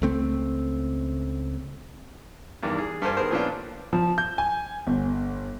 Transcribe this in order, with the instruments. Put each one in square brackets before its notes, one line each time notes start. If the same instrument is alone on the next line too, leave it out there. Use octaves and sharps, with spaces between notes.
[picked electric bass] C#2 A3 C4
[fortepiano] E2 G2 D#3
G#4
G2 A4 A#4 C5 G#5
D#3 B3 G#4 A#4 C5
A#2 F3 B3 C#4 D4 F4
[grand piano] F3
G6
G#5
G1